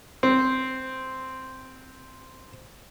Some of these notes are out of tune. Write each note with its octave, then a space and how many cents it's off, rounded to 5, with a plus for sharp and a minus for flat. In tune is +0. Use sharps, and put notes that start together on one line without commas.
C4 -5